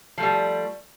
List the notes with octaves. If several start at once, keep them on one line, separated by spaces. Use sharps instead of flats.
F3 G3 A3